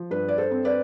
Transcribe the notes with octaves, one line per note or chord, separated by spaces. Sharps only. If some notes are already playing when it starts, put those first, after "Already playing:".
Already playing: F3
G2 B4
D5
A4 C5
C4
B4 D5